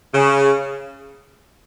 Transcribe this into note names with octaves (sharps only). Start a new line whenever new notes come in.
C#3